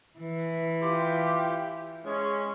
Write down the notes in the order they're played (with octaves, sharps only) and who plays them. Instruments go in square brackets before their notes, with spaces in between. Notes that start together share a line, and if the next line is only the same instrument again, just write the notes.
[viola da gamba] E3
[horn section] F4 G4
G#3 C#4